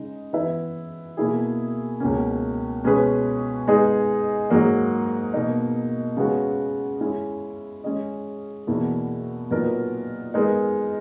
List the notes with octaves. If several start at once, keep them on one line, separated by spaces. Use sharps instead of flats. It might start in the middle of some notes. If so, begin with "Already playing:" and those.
Already playing: C#3 G#3 D#4
E3 B3 E4 B4 E5
B2 A#3 E4 G#4
C#2 B2 A#3 C#4
B2 G#3 C#4 G#4 B4
G#3 B3 D#4 G#4
G#2 F#3 A#3 D#4
B2 A#3 D#4
C#3 G#3 B3 F#4
G#3 C#4 E4
G#3 C#4 G#4 D#5
E2 B2 A#3 E4
A#2 F#3 B3 D#4 A#4
G#3 B3 D#4 A#4